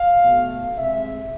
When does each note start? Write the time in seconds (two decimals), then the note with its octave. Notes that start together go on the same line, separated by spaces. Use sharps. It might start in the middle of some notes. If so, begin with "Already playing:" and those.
Already playing: F5
0.25 B2 A3
0.77 C3 G#3 E5